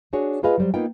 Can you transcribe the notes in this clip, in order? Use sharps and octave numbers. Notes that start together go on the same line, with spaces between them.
D4 F#4 G#4 C#5
F4 G#4 B4 D#5 F5
F#3 G3 C5
A#3 B3 D#4 F4 G5